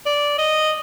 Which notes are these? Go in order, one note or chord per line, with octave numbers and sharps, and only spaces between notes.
D5
D#5